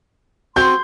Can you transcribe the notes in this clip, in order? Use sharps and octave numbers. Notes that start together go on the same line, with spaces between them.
C4 F#4 C6 G6